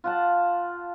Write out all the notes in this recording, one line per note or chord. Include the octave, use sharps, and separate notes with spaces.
F4 F#5 A5